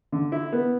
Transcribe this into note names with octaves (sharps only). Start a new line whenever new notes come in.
D3
E4
B3